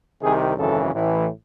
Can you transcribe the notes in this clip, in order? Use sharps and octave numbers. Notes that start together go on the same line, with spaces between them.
C2 C3 D#3 G#4
G#1 F#2 C#3 E3 A4
A1 A2 E3